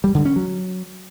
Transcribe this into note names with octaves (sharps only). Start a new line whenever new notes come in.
G3
D3
C#4
F#3